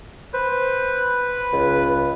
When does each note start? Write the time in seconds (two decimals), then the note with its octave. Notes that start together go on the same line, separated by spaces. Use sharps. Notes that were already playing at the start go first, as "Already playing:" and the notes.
0.34 B4 C5
1.53 C#2